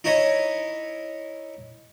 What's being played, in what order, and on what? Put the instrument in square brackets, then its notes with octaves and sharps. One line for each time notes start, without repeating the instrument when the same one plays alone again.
[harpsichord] D#4 E4 C#5 D#5